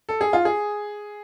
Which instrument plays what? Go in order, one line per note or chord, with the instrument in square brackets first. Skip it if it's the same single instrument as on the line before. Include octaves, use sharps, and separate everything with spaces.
[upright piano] A4
G#4
F4
G#4